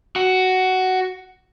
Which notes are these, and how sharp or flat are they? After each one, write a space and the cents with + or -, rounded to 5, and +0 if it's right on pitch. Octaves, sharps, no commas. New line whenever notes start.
F#4 +10